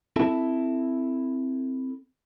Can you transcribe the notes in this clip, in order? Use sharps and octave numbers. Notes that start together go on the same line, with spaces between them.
C4 E4 A4 E5 A5